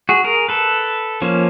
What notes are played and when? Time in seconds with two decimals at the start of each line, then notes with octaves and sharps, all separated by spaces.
0.09 F#4 G#4
0.24 G#4 A#4
0.49 A4 B4
1.22 F3 A#3 C#4